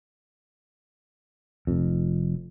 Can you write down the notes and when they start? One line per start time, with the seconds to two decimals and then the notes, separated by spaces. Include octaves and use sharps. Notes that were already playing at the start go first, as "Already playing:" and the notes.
1.67 F1 F2